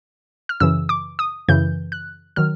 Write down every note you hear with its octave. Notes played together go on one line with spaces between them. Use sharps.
F6
F#2 C#3 E3 E6
D6
D#6
F#2 C#3 E3 G6
F#6
D#3 F#3 F6